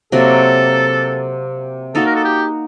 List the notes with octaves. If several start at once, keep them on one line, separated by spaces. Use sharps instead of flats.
C3 F#3 A#3 F#4 A4
A#3 D#4 F#4 A4
A#4
A4
G4